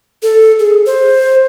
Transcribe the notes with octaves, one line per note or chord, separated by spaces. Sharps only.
A4
G#4
C5